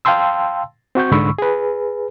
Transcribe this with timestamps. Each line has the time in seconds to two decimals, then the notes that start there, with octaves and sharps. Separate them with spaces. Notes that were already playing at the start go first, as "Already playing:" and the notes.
0.05 F5 G5 A5 C6 E6
0.95 C4 F#4 C#6 G6
1.11 C2 G#2 D3 B5 C#6 E6
1.38 G#4 B4